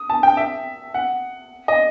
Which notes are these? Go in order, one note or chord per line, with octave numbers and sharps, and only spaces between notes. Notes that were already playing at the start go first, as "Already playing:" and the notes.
Already playing: D#6
A5
G5
E5
F#5
D#5